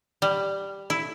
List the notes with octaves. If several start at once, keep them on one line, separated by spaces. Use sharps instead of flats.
G3
E4